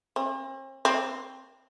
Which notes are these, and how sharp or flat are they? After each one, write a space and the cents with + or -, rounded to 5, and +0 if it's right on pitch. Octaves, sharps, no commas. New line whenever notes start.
C4 +45
C4 +10